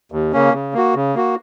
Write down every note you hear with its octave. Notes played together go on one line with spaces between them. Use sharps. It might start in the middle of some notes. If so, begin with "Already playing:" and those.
D#2
C#3 A#3 C#4
C#3
A#3 F#4
C#3
A#3 F#4